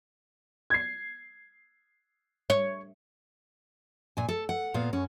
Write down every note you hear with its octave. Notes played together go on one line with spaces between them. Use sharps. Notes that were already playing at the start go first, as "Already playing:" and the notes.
G#6 C7
C#5
A#2 G#5
A4
F#5
A#2 B3 F5
F#2 C#4